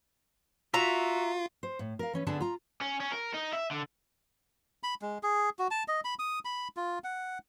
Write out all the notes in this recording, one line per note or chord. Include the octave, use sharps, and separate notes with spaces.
F4 F#4 E5 A#5
C5
A2
A#4 F5
E3 C#4 B4
D3 B3 D4 G#4 A4 A5
F4 A#5
C#4
C#4
A#4
D#4
E5
D3
B5
G#3
G#4
F#4
A5
D#5
B5
D#6
B5
F4
F#5